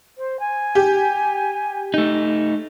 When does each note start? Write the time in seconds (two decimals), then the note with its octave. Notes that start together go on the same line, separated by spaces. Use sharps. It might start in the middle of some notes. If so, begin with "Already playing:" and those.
0.18 C5
0.40 G#5
0.75 G4
1.94 A3 D#4